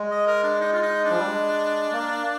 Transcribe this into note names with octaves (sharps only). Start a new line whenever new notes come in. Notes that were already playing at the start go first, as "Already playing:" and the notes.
Already playing: G#3
D#5
A#4
D4
D#4
F4
D#4
D4
F3
G3
G#3
A#3